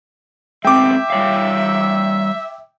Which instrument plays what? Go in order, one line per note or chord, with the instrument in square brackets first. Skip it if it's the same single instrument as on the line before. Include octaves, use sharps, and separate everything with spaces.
[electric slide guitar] G#3 B3 C4 [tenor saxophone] E5 [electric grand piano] G5 D6
[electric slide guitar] G3 C#5 F5